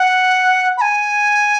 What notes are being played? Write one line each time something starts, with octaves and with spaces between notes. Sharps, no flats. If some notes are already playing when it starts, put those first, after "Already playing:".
Already playing: F#5
B5
G#5